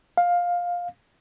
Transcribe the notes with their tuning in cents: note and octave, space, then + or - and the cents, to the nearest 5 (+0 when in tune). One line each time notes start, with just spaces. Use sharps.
F5 +15